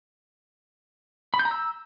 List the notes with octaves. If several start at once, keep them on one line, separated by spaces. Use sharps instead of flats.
B5
G6
A#5
E6